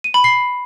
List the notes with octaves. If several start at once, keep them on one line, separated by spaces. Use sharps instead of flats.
D#7
B5
C7